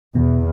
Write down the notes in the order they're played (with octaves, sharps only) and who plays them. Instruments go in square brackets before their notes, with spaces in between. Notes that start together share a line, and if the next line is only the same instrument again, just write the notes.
[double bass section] E2 [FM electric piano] B2